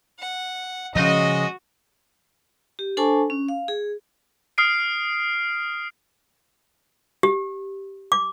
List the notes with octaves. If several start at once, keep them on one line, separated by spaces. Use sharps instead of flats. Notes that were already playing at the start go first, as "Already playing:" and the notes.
F#5
C#3 F3 G#3 F#4 D#5
G4
D4 A4 C5 G#5 A5 C#6
C#4
F5
G#4
D#6 F6 C7 D7
G4
D6